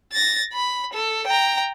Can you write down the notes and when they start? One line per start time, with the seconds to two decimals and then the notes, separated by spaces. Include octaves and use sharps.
0.12 A6 A#6
0.53 B5
0.93 A4
1.27 G5 A#5